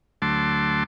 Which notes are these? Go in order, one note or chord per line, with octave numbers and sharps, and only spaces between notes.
D2 F#3 A3 A5 C6 D6